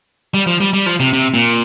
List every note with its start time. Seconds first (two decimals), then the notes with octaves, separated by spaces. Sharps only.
0.34 G3
0.47 F3
0.60 G3
0.73 G3
0.86 F3
1.00 C3
1.13 C3
1.34 A#2